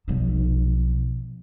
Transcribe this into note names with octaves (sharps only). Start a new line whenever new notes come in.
B1 F3